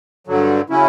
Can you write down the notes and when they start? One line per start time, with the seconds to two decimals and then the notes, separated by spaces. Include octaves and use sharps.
0.27 G2 D3 F#3
0.70 C#3 F#3 C#4 E4